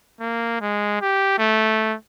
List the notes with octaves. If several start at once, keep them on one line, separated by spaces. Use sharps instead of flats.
A#3
G#3
G4
A3